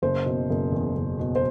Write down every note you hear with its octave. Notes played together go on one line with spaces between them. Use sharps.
F#1 C5
B2
F#1
E2
F#1
B2
C5